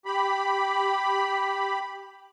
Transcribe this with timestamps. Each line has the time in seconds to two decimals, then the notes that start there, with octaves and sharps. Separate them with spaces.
0.06 G4 B5